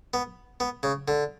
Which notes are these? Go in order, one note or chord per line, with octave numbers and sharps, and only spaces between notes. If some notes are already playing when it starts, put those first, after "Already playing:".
B3
B3
C#3
D3